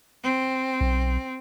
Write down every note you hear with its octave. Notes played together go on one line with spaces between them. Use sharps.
C4
B1